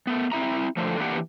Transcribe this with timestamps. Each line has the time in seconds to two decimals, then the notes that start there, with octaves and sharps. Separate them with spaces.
0.07 A3 B3
0.32 C4 E4 E5 A#5
0.77 D3 F3 A3
1.00 E3 A#3 B3 D4 G4 F#5